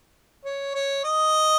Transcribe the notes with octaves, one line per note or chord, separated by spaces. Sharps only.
C#5
C#5
D#5